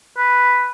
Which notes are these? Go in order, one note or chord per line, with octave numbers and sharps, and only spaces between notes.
B4